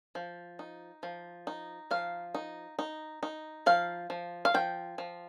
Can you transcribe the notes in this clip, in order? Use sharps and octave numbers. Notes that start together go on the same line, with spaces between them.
F3
D#4
F3
D#4
F3 F5
D#4
D#4
D#4
F3 F5
F3
F5
F3 G5
F3